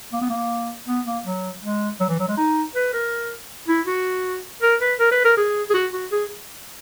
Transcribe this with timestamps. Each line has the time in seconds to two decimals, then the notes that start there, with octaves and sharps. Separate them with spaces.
0.13 A#3
0.21 B3
0.30 A#3
0.87 B3
1.06 A#3
1.25 F#3
1.63 G#3
2.00 F#3
2.09 E3
2.19 F#3
2.28 G#3
2.37 D#4
2.75 B4
2.93 A#4
3.68 E4
3.87 F#4
4.62 A#4
4.81 B4
4.99 A#4
5.12 B4
5.25 A#4
5.37 G#4
5.70 G#4
5.74 F#4
5.93 F#4
6.12 G#4